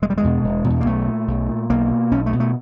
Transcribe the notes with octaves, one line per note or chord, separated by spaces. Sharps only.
E1 G#3
G3
G#3
E2 B2
E1
B2
E2
A#3
B1 A3
A#2
B1
A#2
B1 A#3
B2
B1 C#4
A3
B2
A3